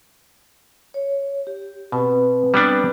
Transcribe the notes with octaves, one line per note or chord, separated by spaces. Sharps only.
C#5
G4
B2 C4 B4
G3 B3 D4